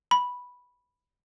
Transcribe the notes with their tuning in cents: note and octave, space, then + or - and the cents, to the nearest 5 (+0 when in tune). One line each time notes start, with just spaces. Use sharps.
B5 -5